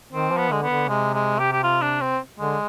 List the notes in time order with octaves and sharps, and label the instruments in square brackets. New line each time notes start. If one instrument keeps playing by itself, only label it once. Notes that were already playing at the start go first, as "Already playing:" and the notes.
[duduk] D#3 [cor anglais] C4
[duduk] F3
[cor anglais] B3
[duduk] D3 [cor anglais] G#3
[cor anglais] B3
[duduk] D3
[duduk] C3 [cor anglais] G#3
[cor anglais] G#3
G4
G4
F4
D4
C4
[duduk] D3 [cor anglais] G#3